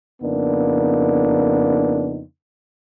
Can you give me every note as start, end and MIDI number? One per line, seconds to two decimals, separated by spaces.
0.22 2.21 41
0.22 2.21 49
0.22 2.21 58
0.22 2.21 59
0.22 2.21 62
0.22 2.21 63